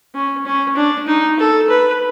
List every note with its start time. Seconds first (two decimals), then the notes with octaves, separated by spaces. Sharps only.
0.15 C#4
0.46 C#4
0.76 D4
1.07 D#4
1.39 A4
1.69 B4